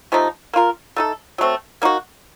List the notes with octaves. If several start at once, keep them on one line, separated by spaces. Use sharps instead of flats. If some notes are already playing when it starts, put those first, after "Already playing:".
C3 F3 A3 D#4
A#3 F4 A#4
A3 D#4 A4
F#3 A3 C4
A#3 D#4 F#4